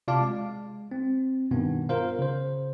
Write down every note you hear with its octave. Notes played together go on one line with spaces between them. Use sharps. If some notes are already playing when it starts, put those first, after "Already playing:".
C3 F4 D5 F5 A5 D6
G#3
C4
G2 B2 D#3 B3
F4 A#4 C5 F5
C#3 C5